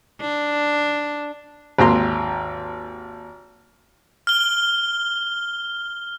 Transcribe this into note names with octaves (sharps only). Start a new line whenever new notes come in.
D4
G#1 D#2 A#5 C6
F6 G7